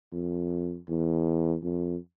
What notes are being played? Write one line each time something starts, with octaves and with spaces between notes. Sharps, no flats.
F2
E2
F2